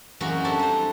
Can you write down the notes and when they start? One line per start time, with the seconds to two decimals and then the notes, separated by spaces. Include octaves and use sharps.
0.20 F#2 E3 G#3 A#3 C4 F#4
0.44 C4 D4 E4 G4 A4 C5
0.59 G3 C5